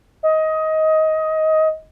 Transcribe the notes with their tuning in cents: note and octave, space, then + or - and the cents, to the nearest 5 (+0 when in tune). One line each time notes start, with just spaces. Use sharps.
D#5 +20